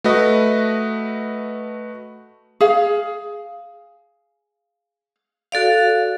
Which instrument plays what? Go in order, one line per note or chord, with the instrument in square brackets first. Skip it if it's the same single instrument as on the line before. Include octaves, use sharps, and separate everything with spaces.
[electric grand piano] A3 F#4 B4 D#5
[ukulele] G#4 F5
[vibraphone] F#4 A4 D5 F5